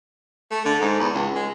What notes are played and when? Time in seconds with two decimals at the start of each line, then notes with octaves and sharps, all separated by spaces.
0.51 A3
0.65 D3
0.81 G#2
1.00 E2
1.14 C#2
1.35 G#3